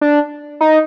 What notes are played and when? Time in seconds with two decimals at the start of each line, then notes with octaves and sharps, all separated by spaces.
0.01 D4
0.61 D#4